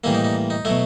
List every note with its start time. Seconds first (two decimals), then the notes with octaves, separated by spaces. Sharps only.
0.04 A2 E3 G3 A#3 E4
0.14 D#4
0.24 D#4
0.50 D#4
0.65 B2 F#3 A3 E4